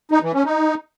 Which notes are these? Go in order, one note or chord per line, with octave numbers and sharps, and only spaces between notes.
D#4
E3
C#4
D#4